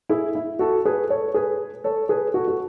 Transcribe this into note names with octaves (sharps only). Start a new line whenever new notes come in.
E4 G#4
E4
F#4 A4
G#4 B4
A4 C#5
G#4 B4
A4 C#5
G#4 B4
F#4 A4
F#4